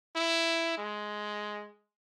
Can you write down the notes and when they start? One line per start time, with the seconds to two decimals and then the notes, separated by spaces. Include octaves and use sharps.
0.16 E4
0.78 G#3